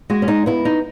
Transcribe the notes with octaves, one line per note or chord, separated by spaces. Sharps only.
G#3 F#4
C#4
D#4
B3 E4
D#4